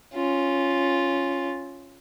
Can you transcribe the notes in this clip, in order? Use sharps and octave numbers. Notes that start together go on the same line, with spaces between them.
C#4 F4